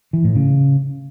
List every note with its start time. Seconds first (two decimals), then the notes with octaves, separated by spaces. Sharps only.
0.13 E3
0.24 A2
0.35 C#3